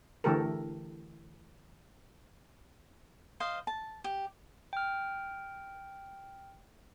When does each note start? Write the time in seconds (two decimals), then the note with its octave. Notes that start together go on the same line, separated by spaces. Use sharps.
0.24 D3 E3 A3 G4 A4 A#4
3.40 C5 D#5 F5
3.67 A5
4.04 G4
4.73 G5 F6